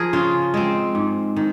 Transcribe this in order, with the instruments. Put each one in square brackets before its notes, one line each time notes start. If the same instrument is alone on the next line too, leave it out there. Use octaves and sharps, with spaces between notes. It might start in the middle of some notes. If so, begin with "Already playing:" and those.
Already playing: [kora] F3 G#4 A#4
C#3 F4
G#3 C4
G#2
D#3